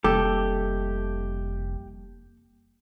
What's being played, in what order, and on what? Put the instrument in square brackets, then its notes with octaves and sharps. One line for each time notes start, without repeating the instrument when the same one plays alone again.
[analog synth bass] F1 [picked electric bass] G3 A#3 [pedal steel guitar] G4 [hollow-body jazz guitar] A4